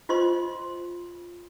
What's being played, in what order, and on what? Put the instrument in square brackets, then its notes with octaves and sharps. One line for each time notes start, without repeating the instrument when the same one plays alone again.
[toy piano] F4 C5 D#5 C6